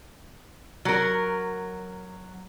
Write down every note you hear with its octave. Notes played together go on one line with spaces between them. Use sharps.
F#3 A#4